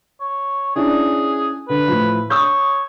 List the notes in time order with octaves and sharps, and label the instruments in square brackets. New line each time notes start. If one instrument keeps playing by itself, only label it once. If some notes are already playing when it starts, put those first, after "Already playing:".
[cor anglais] C#5
[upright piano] C#4 D4 E4 [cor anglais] G#4
[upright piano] D3 [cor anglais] B4
[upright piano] A2 E3 F3
[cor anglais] C#5 [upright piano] D#6 E6 G6